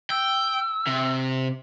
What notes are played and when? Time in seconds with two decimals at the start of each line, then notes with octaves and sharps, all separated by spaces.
0.10 G5 E6
0.87 C3